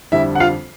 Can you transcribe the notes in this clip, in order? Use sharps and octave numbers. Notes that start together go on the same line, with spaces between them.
F2 D3 G3 E4 E5
F#5
F4 F5